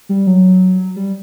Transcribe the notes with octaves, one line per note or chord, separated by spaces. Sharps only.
G3
F#3
G3